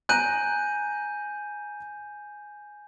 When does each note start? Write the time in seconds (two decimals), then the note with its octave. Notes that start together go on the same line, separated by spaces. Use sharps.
0.09 G#5 A#5 F#6 G6 D#7